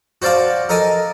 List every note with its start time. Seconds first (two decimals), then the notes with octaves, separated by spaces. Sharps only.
0.22 F#4 C5 D5 F5 A5
0.69 A4 A#4 D#5 G#5 A5